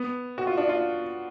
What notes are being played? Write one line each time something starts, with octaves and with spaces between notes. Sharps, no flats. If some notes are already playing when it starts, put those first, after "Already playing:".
Already playing: B3
F#4
F4
D4
F4